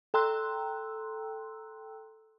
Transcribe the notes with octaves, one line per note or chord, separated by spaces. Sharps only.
A4 G5 A#5 C6 E6 F#6